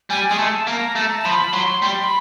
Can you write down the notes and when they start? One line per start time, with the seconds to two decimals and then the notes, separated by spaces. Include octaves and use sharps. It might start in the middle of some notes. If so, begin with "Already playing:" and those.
0.10 G3 G#5
0.28 G#3 G#5
0.38 A3 A5
0.67 A#3 A#5
0.96 A3 A5
1.25 F3 B5
1.53 F#3 C6
1.82 G3 C6
2.04 B5